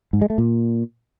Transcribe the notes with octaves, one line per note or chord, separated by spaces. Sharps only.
G#2
G#3
A3
A#2